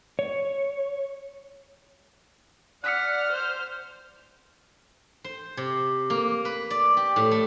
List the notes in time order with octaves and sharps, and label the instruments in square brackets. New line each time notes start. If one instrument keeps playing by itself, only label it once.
[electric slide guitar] C#5
[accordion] D5 [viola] F#5 [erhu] F6 [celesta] F#6 B6 C#7
[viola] C5
[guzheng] C5
C3
A#3
B4
D5
G4
A2
A3